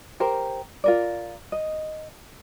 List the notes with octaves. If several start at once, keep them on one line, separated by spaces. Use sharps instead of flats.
G4 A#4 C5
F4 A#4 D5
D#5